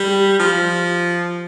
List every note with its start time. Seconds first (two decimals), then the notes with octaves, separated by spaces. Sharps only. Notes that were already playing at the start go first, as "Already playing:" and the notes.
Already playing: G3
0.40 F3